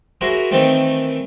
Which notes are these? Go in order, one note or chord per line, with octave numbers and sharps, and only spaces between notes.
E4 F#4 G#4 A#4 C5
D#3 E3 A3 C4 D#4